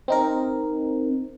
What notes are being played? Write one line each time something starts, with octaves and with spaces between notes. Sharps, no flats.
C4 D#4 A#4